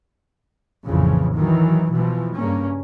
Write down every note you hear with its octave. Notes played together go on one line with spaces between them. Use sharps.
A#1 F2 A2 C#3 E3 F3
D#3 E3 F#3
B2 E3 F3
G2 C#3 A#3 C#4